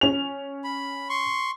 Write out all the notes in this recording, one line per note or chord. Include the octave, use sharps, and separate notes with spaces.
C#4 F7
B5
C6 C#6